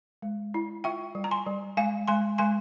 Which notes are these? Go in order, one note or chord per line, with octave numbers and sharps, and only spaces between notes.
G#3
E4
F4 E5 G5
G3
A#5
G#5 C6
G3
G#3 F5 G#5
G#3 G#5 C6
G#3 G#5 C6